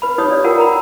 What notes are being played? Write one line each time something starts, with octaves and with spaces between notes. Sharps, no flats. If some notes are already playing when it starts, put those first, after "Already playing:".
B4 B5
D#4 G4 C#5 D#6
D5
F4 A#4 F#5 G5
A#5 B5